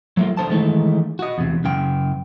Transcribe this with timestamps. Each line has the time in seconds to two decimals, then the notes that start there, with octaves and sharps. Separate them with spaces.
0.17 F#3 A3 A#3 F4
0.37 D#2 D3 C5 A5
0.50 D#3 E3 G#3 A3 D#4
1.19 F#4 D#5
1.38 E2 C3
1.64 F#2 C#3 G5